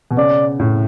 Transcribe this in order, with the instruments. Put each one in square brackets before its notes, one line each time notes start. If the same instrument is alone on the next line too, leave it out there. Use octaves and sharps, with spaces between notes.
[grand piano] B2
[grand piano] C#3 [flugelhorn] D5
[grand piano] A2